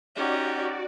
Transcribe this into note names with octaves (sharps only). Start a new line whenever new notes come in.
C#4 D#4 F#4 G4 D5